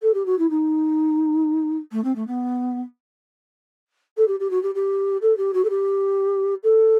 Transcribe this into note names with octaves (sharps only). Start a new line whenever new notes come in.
A4
G4
F#4
E4
D#4
A3
C4
A3
B3
A4
G4
G4
F#4
G4
G4
A4
G4
F#4
A4
G4
A4